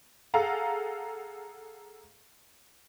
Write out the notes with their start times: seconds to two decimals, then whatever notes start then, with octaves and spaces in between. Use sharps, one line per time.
0.34 G#4 A4 F5 F#5 A#5